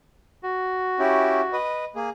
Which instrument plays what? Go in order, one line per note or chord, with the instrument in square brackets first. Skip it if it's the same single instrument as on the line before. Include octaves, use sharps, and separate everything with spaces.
[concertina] F#4
[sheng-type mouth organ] C#4 E4 G4
B4 D#5
A#3 G#4